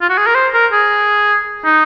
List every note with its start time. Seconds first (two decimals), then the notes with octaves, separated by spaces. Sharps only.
0.01 F4
0.09 F#4
0.17 G#4
0.27 A#4
0.35 C5
0.53 A#4
0.72 G#4
1.65 D#4